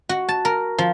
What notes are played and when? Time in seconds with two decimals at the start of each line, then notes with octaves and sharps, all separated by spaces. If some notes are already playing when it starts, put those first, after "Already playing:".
0.09 F#4
0.29 A5
0.45 A#4
0.78 F3